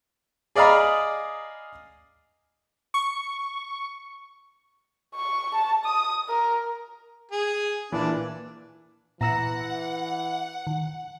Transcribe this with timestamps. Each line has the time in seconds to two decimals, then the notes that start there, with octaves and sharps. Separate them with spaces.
0.56 G#4 D5 D#5 F5 A#5 B5
2.94 C#6
5.15 C#6
5.55 A5
5.85 D#6
6.28 A#4
7.32 G#4
7.92 A#2 E3 D4 E4
9.21 A#2 E3 F#5 A#5 E6 A#6
10.67 D#3